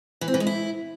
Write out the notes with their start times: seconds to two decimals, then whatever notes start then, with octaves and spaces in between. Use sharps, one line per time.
0.21 E3
0.28 C4
0.34 E3
0.40 G#3
0.47 E4